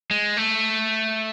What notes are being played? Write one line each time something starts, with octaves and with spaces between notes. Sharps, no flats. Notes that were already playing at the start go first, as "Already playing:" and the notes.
G#3
A3